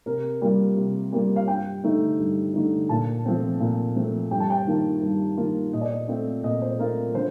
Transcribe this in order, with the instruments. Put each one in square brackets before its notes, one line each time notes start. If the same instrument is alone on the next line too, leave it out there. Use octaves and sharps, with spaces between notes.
[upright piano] C3 A#4
G3 A#3 F4
C3
G3 A#3 F4
F5
G2 G5
D3 A3 D#4
G2
D3 A3 D#4
A#2 A5
F3 A3 C4
A#2
F3 A3 C4
G2 G5
A5
G5
D#3 A#3 F4
G2
D#3 A#3 F4
A#2 D#5
D5
D#5
A3 C4 F4
A#2 D#5
C5
A3 C4 F4 A#4
D3 C5